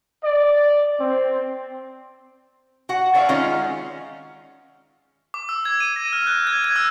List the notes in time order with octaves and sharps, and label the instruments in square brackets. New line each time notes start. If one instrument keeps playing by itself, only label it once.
[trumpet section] D5
C4
[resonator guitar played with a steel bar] F#4 F#5
B4 C#5 D5 E5 F5
D#3 G#3 C#4 D#4 F4
[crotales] D6
E6
G#6
D#7
A#6
F6
F#6
G#6
G#6
E6